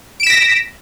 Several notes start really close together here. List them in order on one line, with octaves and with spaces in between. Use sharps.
D7 E7 B6 A#6